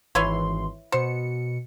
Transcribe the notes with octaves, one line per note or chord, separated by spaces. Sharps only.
G#1 E3 E4 B4 C#5 C6
B2 C5 C#7